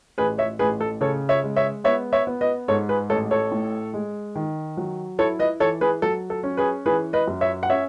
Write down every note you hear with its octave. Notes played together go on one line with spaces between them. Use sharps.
A1 G#4 B4
C#5 E5
A1 G#4 B4
A4
C#3 A4 C#5
C#5 E5
G#3
C#5 E5
B3 C#5 E5
C#5 E5
B3
B4 D#5
G#2 A4 C#5
G#4 B4
A1 A4 C#5
A4 C#5
A2
G#3
D#3
F#3
E4 A4 C#5
B4 D#5
E3 A4 C#5
G#4 B4
F#3 A4
A4
C#4
G#4 B4
E3 G#4 B4
B4 D#5
F#2
C#5 E5
F#5
C#4 C#5 E5